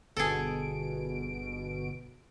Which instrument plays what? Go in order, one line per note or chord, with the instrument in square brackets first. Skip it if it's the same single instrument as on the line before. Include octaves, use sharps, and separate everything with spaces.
[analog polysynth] G1 B2 D7 [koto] G#4 A4